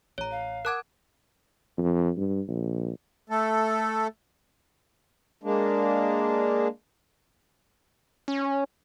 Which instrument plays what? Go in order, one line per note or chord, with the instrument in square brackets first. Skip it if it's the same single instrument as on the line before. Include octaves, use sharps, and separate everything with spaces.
[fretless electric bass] A1 [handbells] C#5 A#5
[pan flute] F5
[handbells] A#4 A5 G#6 [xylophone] F#5 D6 F#6
[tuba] F2
G2
A#1
[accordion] A3 A4
[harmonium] G#3 A#3 D4
[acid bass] C#4